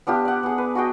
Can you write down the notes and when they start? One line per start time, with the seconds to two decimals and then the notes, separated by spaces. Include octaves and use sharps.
0.07 B3 D4 F4 G4
0.25 D5 F#5
0.43 B3 G#4
0.58 B4
0.75 F#4 G#4 D#5 G5